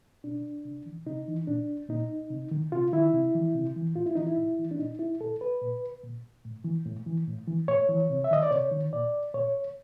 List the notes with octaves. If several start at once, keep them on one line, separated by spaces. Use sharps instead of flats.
B2 D4
C3
E3
C3 D#4
E3
A#2 D4
A#2 D#4
C3
D#3
C3 F4
D#3 E4
C3
E3
C3
E3
A2 F4
E4
E3 D#4
E4
A2
E3
D4
A#2 D#4
E4
A#2 A4
B4
A#2
A#2
A2
E3
A2
E3
A2
E3
A2 C#5
E3
C3
E5
D#3 D#5
D5
C3 C#5
D#3
A#2 D5
A#2 C#5